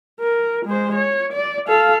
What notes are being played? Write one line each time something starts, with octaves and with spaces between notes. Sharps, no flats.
A#4
G#3 C5
C#5
D5
A4 F5